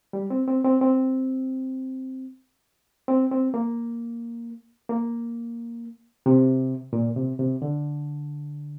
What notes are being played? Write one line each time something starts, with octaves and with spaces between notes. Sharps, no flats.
G3
C4
C4
C4
C4
C4
C4
A#3
A#3
C3
A#2
C3
C3
D3